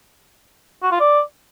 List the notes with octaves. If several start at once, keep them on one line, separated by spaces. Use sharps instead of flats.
F#4
F4
D5